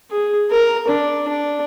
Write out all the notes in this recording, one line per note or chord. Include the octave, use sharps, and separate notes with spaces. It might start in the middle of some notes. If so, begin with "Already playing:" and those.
G#4
A#4
D4
D4